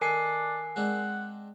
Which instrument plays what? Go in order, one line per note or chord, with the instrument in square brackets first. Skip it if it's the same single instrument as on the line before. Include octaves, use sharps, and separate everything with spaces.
[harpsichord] D#3 A4 [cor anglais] D4 [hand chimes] A#4 G#5 C7
[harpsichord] G#3 C4 D4 [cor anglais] F#5